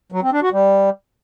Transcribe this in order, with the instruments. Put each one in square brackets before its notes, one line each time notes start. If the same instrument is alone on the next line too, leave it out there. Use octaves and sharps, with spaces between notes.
[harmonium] F#3
C4
D4
F#4
G3